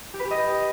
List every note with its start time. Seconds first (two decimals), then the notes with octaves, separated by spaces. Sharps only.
0.14 G4
0.19 B4
0.25 G4
0.31 D#5